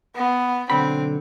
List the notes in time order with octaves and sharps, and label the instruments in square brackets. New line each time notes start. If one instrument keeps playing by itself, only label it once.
[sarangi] B3
[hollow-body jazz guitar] B1 D3 B5 [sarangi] C4